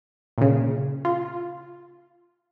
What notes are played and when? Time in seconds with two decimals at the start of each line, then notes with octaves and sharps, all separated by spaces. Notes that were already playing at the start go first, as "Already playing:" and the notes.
0.38 A#2 C#3
1.05 F4